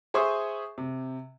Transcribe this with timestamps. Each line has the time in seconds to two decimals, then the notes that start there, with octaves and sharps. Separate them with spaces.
0.14 G#4 C5 E5 G#5 C#6 D#6
0.78 C3